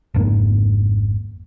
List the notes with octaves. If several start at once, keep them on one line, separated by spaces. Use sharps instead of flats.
G#1 F2 G#2 A#3